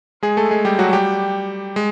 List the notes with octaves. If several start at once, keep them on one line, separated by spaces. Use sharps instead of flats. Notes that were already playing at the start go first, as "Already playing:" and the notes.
G#3 G#4
A3 A4
G#3 G#4
G3 G4
F#3 F#4
G3 G4
G#3